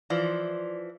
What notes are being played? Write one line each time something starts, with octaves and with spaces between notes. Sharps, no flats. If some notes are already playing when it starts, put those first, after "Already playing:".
E3 F3 D5 C6